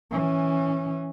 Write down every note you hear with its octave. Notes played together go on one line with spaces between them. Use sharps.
E3 C#4